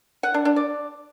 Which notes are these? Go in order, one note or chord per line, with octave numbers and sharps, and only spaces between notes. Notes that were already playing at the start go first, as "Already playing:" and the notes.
F#5
D4
D4
D5